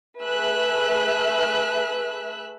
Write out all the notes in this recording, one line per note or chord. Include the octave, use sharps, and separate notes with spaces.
A3 G#4 B4 E5 E6 F#6